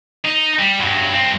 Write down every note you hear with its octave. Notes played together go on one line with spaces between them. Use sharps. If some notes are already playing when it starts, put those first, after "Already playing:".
D#4
G3
G2 F#3
G2 C4